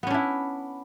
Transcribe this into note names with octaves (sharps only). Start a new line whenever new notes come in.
B3 C#4 D4 E4